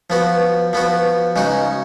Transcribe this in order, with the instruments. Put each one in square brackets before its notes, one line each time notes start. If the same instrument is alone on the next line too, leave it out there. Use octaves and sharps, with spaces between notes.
[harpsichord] F3 B3 F#4
F3 B3 F#4
C#3 G#3 D#4 F#4